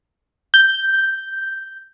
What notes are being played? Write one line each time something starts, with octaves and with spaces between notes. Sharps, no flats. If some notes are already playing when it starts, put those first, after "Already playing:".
G6